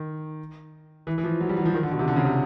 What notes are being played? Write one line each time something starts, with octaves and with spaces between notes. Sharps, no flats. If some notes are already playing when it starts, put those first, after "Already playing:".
Already playing: D#3
E3
E3
F3
F#3
G3
F#3
F3
D#3
D3
B2
C3
D3
C#3
C3